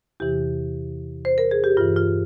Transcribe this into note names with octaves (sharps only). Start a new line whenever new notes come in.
E2 C3 E3 G4
C5
A#4
G#4
G4
G2 E3 F4
F4